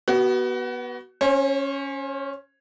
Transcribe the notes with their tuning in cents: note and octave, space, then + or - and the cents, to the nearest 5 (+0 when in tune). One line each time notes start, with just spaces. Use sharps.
B3 -15 F#4 +30
C#4 +0 C5 +45